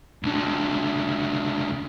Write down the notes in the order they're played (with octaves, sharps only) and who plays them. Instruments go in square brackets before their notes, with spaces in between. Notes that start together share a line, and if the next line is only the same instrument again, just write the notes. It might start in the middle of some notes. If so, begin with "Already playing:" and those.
[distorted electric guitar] C#2 D3